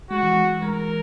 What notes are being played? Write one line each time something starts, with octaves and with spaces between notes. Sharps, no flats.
G#3 F#4
E3
E3
G#3 A#4